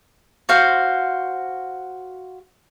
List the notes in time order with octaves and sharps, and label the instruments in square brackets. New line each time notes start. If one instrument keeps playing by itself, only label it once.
[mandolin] F#4 C5 F5